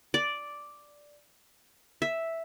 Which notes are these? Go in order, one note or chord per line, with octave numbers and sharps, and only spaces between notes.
D5
E5